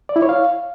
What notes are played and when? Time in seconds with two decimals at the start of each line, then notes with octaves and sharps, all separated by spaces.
0.09 D5
0.16 E4
0.22 C#5
0.29 F5